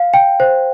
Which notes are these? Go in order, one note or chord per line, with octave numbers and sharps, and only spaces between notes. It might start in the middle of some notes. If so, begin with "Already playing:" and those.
Already playing: F5
G5
C5